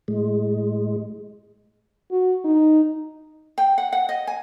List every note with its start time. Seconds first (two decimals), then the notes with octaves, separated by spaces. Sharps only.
0.08 A2 G#3
2.11 F#4
2.45 D#4
3.58 G5
3.78 F#5
3.93 F#5
4.09 D#5
4.27 G#5